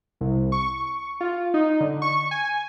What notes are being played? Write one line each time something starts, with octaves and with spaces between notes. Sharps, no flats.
C2
C#6
F4
D#4
D3
C#6
G#5